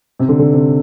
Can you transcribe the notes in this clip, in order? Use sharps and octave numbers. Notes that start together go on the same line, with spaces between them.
C3
D3
D3
C3